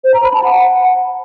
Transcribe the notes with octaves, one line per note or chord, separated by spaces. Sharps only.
C5
A#5
B5
A5
F#5